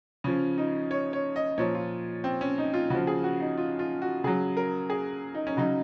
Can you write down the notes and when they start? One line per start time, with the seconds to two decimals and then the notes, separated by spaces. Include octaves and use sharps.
0.24 C#3 F3 C#4
0.58 D#4
0.91 C#5
1.13 C#5
1.36 D#5
1.58 A#2 F3 C#5
1.75 F4
2.24 C4
2.41 C#4
2.58 D#4
2.74 F4
2.90 C#3 F3 F#4
3.07 G#4
3.24 F#4
3.40 D#4
3.58 F4
3.79 F4
4.02 F#4
4.24 C#3 F#3 G#4
4.57 A#4
4.90 G#4
5.35 D#4
5.47 C#4
5.57 C#3 F#3 D#4